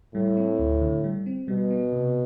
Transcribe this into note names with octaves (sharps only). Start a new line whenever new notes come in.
A2 G3
C4
D2
D3
G3
C4
B2 G3
B3
C3